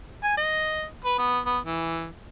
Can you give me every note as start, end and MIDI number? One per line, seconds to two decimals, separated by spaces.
0.23 0.36 80
0.37 0.84 75
1.04 1.17 71
1.18 1.39 59
1.46 1.59 59
1.65 2.08 52